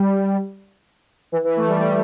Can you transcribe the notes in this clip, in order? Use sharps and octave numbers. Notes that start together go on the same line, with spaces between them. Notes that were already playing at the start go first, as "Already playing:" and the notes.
Already playing: G3
E3
E3
A3
G3
G3